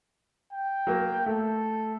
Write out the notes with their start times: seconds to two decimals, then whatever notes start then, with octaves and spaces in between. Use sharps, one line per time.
0.53 G5
0.87 F#3 A#3
1.26 A3 A4